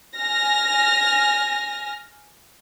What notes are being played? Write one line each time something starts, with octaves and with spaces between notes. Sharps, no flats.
G#5 F6 A#6